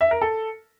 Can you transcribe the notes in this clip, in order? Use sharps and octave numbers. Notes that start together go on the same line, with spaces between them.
E5
A#4
A4